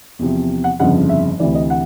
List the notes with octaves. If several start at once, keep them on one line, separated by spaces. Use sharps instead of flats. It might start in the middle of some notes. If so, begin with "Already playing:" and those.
E2 C3 F3
F#5
G1 F2 C#3 F3 F#5
E5
D2 C3 E3 D5
D#5
F#5